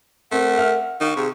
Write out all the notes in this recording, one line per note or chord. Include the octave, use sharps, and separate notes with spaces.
A3 C4 A#4 F#5
E5 F6
D#3 F5 C#6
C3 G#4